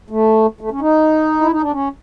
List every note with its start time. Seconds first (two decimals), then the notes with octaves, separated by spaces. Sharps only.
0.10 A3
0.61 A3
0.71 C#4
0.81 D#4
1.41 E4
1.51 D#4
1.61 D4
1.72 C#4